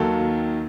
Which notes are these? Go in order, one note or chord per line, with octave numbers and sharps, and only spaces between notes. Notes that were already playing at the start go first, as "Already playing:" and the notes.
Already playing: D#2 D#3 F#3 A4